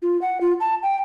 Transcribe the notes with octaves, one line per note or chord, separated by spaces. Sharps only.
F4
F#5
F4
A5
G5